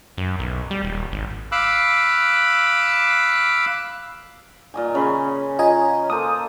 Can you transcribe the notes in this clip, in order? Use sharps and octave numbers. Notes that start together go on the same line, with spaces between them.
F#2
B1
G3
D#1
G#1
F5 B5 D6 E6 F#6
A#2 D#5 G#5
C#3 C#4 B5 C6
F4 D#5 G#5 A#5
A#3 A4 C5 D#6